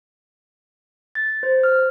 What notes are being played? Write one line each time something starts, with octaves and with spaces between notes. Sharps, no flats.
A6
C5
F6